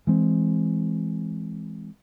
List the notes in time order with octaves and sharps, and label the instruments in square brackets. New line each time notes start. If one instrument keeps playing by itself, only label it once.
[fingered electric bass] E3 G#3 C4